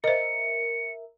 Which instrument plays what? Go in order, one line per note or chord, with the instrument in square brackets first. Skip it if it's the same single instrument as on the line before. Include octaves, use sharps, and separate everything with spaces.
[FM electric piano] A#4 E5 [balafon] C5 D#5 [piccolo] C#7